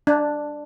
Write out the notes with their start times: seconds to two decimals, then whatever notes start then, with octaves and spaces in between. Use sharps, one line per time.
0.07 D4